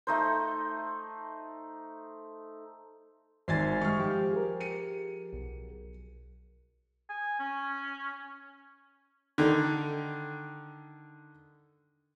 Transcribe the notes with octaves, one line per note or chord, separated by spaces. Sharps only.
A3 D#4 C5
G#1 C5 E5 G#5 G#6 A6 C7
G3 G#3 D#4 C#6 F6
F3 G4
G#4 A#4
C#7 D#7
B1
G#5
C#4
D3 D#3